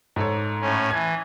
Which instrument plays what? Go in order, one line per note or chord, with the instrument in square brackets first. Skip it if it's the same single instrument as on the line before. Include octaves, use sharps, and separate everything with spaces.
[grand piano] G#2 A4 C#5
[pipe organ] A2 C#4
[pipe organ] E3 [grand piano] G#6